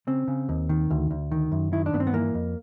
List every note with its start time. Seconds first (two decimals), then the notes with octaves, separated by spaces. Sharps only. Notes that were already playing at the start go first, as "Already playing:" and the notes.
0.07 C#3 C4
0.28 C#3
0.49 D#2
0.69 D#3
0.90 D2
1.11 D2
1.31 D#3
1.52 F#2
1.73 D#3 E4
1.86 D4
1.93 G2 B3
2.00 C4
2.07 B3
2.14 E3 A#3
2.35 F2